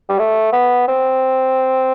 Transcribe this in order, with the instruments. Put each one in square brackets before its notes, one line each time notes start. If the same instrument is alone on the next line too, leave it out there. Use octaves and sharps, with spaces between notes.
[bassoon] G3
A3
B3
C4